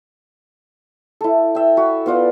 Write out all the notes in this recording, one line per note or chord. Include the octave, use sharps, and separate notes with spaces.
E4 A4
E5 G5
F#4 B5
B3 F4 D5 F#5